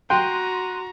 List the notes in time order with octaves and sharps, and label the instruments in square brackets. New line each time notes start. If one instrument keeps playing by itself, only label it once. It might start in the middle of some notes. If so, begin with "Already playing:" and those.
[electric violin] F#4 A#5 [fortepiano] G5 [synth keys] C6 F#6 D#7